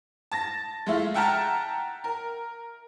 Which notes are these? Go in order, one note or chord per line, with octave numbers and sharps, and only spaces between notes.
A5 A6 A#6
G#3 A3 E4 F4
E5 F#5 G5 A5 A#5 F6
A#4